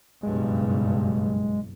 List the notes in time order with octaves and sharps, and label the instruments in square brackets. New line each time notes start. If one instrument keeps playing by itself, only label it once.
[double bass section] F#1 B1 G2 [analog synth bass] G#3